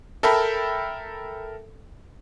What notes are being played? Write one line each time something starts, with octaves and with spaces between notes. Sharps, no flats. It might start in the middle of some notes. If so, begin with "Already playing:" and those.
A4 A#4 E5 G5 A5 B5